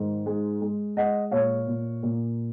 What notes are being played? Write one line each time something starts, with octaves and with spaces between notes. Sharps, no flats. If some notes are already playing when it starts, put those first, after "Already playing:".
Already playing: G#2 D#3
G#3
G#3
G#3 D#5 F#5
A#2 C#5 F5
A#2
A#2